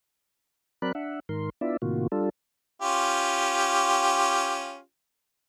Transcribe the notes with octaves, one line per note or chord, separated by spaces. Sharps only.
F#3 C4 A#4 D5 B5 F#6
D4 E5 F#5
G#2 D#3 A#4 C6
B3 D4 E4 F4 D5 E5
A2 C3 D#3 A#3 F4 F#4
G3 D4 F4 A4
C#4 F4 G4